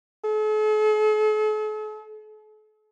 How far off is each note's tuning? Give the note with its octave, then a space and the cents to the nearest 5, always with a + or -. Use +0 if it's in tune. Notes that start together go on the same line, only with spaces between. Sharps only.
A4 -45